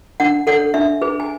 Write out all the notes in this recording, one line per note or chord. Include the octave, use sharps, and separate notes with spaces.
D4 F#5
A4 C#5 F#5
D4 E5
G#4 B4
G#5